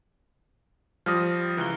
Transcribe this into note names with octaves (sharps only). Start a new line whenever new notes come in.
F3 G3 D#6 F6 A#6
C#2 E3 F6 G7